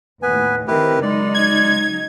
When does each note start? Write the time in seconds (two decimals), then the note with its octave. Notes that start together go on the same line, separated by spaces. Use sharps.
0.22 D#2 A2 B3 B4 G#5
0.67 D#3 C4 E4 G4 A#4 B4
1.02 C#3 F#3 G#3 D#4 D5
1.34 G#6